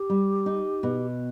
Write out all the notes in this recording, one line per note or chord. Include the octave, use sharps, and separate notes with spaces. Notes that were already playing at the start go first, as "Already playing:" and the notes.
Already playing: G4
G3
D#4
B2